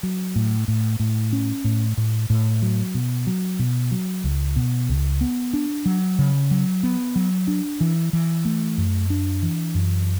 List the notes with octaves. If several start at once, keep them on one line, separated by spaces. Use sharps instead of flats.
F#3
A2
A2
A2
C#4
A2
A2
A2
F#3
B2
F#3
B2
F#3
C#2
B2
C#2
B3
D4
F#3
C#3
F#3
B3
F#3
D4
E3
E3
A3
F#2
D4
E3
F#2